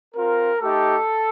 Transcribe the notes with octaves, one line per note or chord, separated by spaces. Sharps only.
C4 F4 A#4
A3 D#4 G4 A4